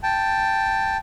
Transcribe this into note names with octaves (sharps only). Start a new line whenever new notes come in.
G5 A5